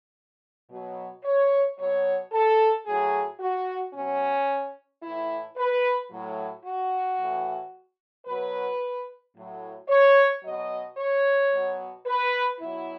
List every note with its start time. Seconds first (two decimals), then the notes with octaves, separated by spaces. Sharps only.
0.70 B2 F#3
1.24 C#5
1.78 B2 F#3 C#5
2.32 A4
2.86 A2 F#3 G#4
3.40 F#4
3.94 B2 F#3 C#4
5.03 A2 E3 E4
5.57 B4
6.11 A2 F#3
6.64 F#4
7.18 A2 E3
8.26 B2 F#3 B4
9.36 A2 F#3
9.88 C#5
10.43 B2 F#3 D#5
10.97 C#5
11.52 B2 F#3
12.06 B4
12.60 B2 F#3 E4